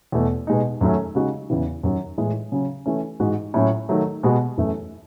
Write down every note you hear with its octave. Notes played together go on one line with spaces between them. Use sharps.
E2 B2 A3
B2 G#3 D#4
F#2 D#3 F#3 A3 C#4
C#3 G#3 D#4 F#4
E2 C#3 E3
F#2 D#3 F#3
A2 E3 G#3
C#3 F#3 C#4
E3 A3 C#4
G#2 E3 G#3 D#4 F#4
A2 F#3 C#4 E4
D#3 F#3 A3
B2 G#3 B3 F#4
F#2 E3 A3